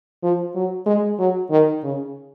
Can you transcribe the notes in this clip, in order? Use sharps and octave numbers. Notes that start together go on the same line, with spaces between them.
F3
F#3
G#3
F#3
D#3
C#3